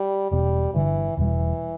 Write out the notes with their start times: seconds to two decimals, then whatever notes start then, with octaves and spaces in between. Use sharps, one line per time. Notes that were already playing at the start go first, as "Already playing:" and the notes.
Already playing: G3
0.31 E1 E2 B2 G3 B3
0.74 G1 G2 D3 E3
1.17 E1 E2 B2 E3 G3